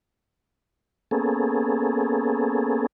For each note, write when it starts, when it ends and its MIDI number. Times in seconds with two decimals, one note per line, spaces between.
1.11 2.86 58
1.11 2.86 59
1.11 2.86 61
1.11 2.86 68
1.11 2.86 69